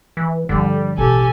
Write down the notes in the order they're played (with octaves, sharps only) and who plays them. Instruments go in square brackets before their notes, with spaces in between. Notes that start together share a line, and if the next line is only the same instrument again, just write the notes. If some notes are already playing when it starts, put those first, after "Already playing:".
[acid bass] E3
[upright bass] G2 F3 [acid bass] D3 [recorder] G3
[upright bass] A1 B2 [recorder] G4 [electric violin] A4 G#5